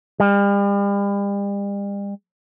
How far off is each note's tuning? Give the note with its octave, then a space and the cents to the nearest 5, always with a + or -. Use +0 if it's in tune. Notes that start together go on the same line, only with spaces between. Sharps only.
G3 +40